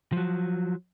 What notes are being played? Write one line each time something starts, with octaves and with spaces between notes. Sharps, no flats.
F3 F#3